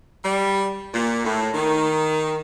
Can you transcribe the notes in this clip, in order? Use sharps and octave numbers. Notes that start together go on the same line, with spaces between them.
G3
A#2
A2
D#3